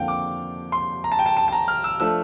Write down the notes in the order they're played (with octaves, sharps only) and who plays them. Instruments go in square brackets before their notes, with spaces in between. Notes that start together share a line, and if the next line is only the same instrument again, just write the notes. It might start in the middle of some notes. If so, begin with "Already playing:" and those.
Already playing: [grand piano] F2 D3 F3 A#3 D4 F5 G5
D6
C6
A#5
A5
G5
A5
A5
A5
A#5
F6
E6
F3 A3 D4 E6